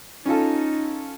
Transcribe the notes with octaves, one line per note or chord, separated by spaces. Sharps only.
C#4 D#4 F4 A4